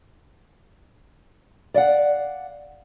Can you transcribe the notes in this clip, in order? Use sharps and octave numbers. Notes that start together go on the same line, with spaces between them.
D5 D#5 F5 F#5